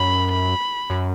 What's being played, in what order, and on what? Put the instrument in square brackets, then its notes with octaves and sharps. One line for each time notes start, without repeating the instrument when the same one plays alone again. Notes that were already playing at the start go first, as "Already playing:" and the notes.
Already playing: [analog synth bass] F#2 [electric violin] B5
[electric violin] B5
[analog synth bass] F#2